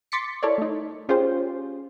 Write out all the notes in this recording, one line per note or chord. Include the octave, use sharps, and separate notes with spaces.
C6 D6 A6 B6 C#7
E4 A4 A#4 C#5 D5
A3 D#4
C#4 F4 G4 G#4 C5